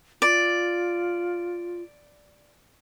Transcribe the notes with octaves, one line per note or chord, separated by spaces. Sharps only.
F4 D5